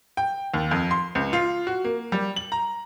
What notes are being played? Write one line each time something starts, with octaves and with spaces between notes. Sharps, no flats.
G5
D#2
F2
C6
C#2
F4
F#4
A#3
G3
F#7
A#5